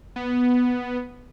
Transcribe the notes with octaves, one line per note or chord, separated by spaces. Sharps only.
B3